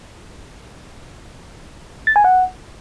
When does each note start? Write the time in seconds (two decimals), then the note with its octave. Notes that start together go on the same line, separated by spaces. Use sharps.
2.07 A6
2.16 G#5
2.24 F#5